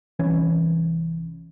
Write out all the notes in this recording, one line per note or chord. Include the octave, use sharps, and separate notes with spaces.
C2 E3 C#4